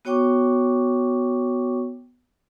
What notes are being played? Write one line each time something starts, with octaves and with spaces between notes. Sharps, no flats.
B3 F#4 C#5 G5 C#6 D6